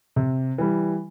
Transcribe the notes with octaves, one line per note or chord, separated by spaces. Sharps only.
C3
E3 G3